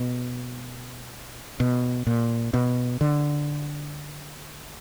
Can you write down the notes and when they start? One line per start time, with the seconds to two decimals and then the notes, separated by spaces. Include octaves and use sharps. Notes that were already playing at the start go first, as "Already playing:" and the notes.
Already playing: B2
1.60 B2
2.07 A#2
2.54 B2
3.01 D3